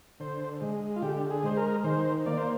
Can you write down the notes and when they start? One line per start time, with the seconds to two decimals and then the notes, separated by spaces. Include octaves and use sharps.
0.20 D3 C5
0.61 G#3
0.96 F4
1.02 D3 G4
1.30 G#4
1.43 G#3 C5
1.57 A#4
1.84 D#3 C5
2.26 A#3 D5
2.37 C5